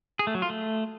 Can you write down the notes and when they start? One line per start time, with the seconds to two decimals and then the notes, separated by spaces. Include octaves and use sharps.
0.19 G#4
0.27 A3
0.35 F#3
0.42 F4
0.50 A3